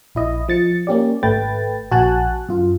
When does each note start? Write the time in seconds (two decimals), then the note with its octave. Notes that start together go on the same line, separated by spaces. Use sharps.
0.15 A#1 E4 D#5
0.48 F3 A6 C#7
0.87 A#3 C#4 G4 D5
1.23 G#1 A3 B4 G5 A6
1.91 A#1 F#4 G#5 A5 F#6
2.49 F#2 F4